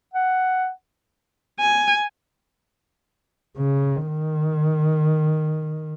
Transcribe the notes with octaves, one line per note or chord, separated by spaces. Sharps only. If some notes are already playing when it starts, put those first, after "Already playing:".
F#5
G#5
C#3
D#3